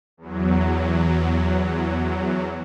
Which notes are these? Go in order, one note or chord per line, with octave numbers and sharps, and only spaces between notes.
E2 F#3